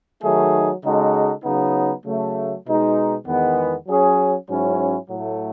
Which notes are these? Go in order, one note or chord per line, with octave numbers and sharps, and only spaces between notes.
D#3 F#3 A3 D#4 G#4
C#3 G#3 D#4 F#4 A4
C#3 F#3 B3 D#4
C#3 F#3 A3
B2 G#3 D#4
E2 D#3 G#3 B3
F#3 C#4 G#4
G#2 F#3 C#4 E4
A2 F#3 A3